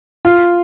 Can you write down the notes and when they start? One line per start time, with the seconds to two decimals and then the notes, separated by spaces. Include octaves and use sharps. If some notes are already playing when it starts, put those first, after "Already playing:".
0.25 F4